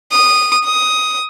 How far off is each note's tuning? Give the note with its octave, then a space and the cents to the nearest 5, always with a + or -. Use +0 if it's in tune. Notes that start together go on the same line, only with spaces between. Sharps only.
D#6 -15
D#6 +10